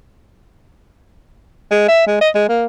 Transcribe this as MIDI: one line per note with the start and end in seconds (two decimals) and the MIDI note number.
1.71 1.85 56
1.88 2.02 76
2.07 2.18 56
2.21 2.29 75
2.35 2.47 56
2.48 2.66 58